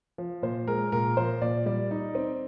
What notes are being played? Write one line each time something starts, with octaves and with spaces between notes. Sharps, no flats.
F3
A#2 C5
G#3 A#4
A#2 A#4
F3 C5
A#2 D5
G3 D5
D#4
C4